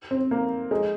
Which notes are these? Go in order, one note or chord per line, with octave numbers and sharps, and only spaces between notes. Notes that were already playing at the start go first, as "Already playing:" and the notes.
C4
A#3
G#3